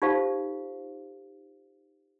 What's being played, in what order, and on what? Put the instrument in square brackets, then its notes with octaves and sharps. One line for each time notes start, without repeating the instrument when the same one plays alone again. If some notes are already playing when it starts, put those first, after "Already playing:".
[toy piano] D#4 F4 G4 A4 C5 F5